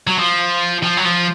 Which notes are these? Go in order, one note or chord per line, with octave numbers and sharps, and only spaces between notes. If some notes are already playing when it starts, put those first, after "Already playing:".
F#3
F3
F3
F#3
F3